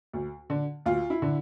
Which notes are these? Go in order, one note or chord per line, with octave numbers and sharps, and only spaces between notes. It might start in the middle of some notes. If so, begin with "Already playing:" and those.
D2
D3
D2 F4
E4
D3